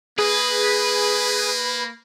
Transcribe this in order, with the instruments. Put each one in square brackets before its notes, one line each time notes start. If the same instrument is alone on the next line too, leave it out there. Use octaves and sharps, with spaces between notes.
[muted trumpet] A#3 [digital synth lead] G#4 [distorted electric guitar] B4